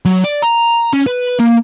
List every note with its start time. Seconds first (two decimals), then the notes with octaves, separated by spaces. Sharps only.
0.05 F#3
0.24 D5
0.42 A#5
0.93 C#4
1.06 B4
1.40 A#3